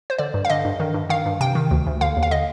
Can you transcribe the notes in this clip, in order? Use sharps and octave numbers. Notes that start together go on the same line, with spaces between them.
C5
D3 D5
G2
F5
D3 D#5
G2
D#3
G2
D#3 F5
G2
C3 G5
D#3
D2
D2
D3 F5
D#2
F5
D3 D#5